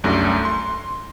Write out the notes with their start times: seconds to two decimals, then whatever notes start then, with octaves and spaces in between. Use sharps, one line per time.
0.04 C2 F#2 A3 D4 A#6
0.45 C6